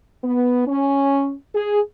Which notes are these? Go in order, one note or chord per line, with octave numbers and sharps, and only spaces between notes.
B3
C#4
G#4